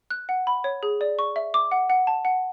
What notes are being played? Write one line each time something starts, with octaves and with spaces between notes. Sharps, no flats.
F#6
F#5
B5
C#5
G#4
D5
C#6
E5
D6
F#5
F#5
A5
F#5